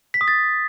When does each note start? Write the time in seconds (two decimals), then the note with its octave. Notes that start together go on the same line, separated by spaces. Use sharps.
0.14 B6
0.21 D#6
0.28 A6